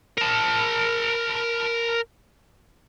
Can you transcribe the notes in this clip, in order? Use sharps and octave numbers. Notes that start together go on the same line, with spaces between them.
A#4 A5